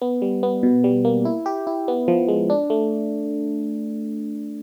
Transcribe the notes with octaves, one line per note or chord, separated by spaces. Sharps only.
B3
G3
B3
B2
G3
A#3
E4
G4
E4
B3
F3
G#3
D4
A3